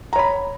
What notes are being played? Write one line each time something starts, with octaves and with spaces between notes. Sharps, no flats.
C#5 A#5 B5